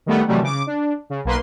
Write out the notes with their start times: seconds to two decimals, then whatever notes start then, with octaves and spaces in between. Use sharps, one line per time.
0.06 D#3 G3 A3 B3
0.28 C3 D#3 E3 F#3 G3 A3
0.42 C#3 D6
0.67 D4
1.10 C#3
1.25 B1 A#3 B4 C6